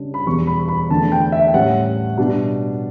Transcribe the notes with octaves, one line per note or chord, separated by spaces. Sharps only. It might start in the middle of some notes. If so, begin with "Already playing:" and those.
Already playing: C#3 G3 D4
B5
E2 B2 G3 C#6
B5
B5
E2 D3 A3 D4 A5
G5
E5
G5
A2 G3 C#4 F#5
B2 G3 D4